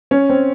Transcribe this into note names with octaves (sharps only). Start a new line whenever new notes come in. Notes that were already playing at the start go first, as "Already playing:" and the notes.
C#4
C4